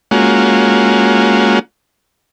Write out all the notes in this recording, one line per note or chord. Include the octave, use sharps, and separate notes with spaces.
G#3 A#3 C#4 F4 F#4